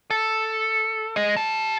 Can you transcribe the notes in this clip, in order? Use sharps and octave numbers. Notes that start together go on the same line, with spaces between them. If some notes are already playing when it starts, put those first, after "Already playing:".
A4
G#4 D#5
G4 A5